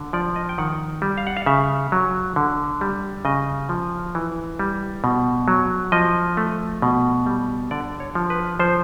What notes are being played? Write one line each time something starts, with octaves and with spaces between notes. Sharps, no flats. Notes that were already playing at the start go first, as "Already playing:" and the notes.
Already playing: D3
F3 D5
D#5
G5
D#3 F#5
G3
F5
F#5
F5
C#3 E5
F#3
D3
G3
C#3 D#5
F3
E3
G3
B2
F#3
F3 D#5
A3
B2
G3
D3 D5
C#5
F3
B4
F3 C5